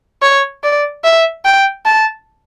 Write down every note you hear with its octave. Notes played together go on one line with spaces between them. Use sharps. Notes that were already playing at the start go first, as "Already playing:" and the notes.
C#5
D5
E5
G5
A5